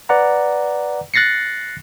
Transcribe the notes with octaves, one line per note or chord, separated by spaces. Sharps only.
B4 D5 F#5 A#5
F#6 A6 A#6 C7 C#7